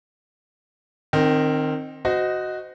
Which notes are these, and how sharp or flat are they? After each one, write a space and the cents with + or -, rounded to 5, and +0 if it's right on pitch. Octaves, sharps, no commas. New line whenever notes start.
D#3 -15 C4 +15
F#4 +0 C5 -30 D#5 +0